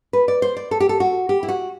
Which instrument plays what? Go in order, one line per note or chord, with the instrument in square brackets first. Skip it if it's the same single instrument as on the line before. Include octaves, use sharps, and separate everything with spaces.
[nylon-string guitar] B4
D5
C5
D5
A4
G4
A4
F#4
G4
E4
F#4